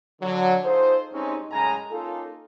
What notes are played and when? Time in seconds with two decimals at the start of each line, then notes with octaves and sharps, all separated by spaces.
0.22 D3 F#3
0.64 D#4 F4 G#4 A4 C5
1.12 G2 G#3 C4 C#4 D#4
1.51 F#2 A2 C#3 G#3 G#5 A#5
1.91 A#3 C#4 D#4 F4 A4